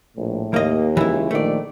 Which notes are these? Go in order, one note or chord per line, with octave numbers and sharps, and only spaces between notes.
A#1 A2
D#2 A#3 D#5
C#2 E3 E4
A#1 D#3 A3 D5